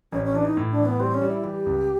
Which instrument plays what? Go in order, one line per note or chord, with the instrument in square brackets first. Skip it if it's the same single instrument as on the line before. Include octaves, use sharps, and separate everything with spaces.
[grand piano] A1 [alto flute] C#4
[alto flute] C#4
[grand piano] E3 [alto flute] D4
[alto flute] D#4
[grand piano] A2
[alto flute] D4
[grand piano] E3
[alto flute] B3
[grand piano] G3 [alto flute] C4
[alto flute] C#4
[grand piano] G3
[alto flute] E4
[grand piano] E3 [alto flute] G4
[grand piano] C#2